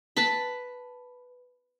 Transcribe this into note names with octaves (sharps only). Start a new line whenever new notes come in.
B4 A5 B5